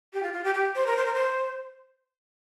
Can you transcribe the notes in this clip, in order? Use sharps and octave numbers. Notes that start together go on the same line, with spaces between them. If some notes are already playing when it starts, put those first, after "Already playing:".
G4
F4
F4
G4
G4
C5
A#4
C5
A#4
C5